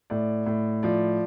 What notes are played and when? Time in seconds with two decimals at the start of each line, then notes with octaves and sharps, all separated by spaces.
0.10 A2 D5
0.46 A2
0.83 F3 D5